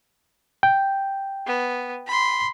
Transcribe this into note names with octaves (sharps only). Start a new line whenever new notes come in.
G5
B3
B5 C6